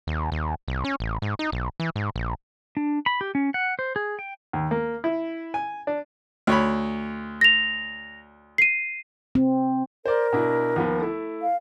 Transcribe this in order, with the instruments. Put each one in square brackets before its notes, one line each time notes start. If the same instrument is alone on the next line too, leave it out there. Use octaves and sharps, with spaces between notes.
[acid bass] D#2
D#2
C2
C#4
A1
G#2
D#4
B1
E3
G#2
A#1
[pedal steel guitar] D4
B5
G4
C#4
F#5
C5
G#4
G5
[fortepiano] D#2
A#3
E4
G#5
D4
D2 C#5 B5
[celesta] A#6 F7
C7 D#7
[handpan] C4
[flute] A#4 [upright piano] C5 D5
[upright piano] B2 D4 E4
D#2 F3 B3
A3 E4
[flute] F5